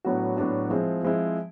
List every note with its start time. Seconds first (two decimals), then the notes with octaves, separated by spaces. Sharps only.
0.04 A2 F#3 B3 D4 F#4
0.37 A2 F#3 B3 D4 F#4
0.70 F3 G#3 C4 E4
1.03 F3 G#3 C4 E4